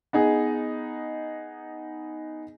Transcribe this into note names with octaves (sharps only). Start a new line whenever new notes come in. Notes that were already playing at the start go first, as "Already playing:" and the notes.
B3 D#4 G#4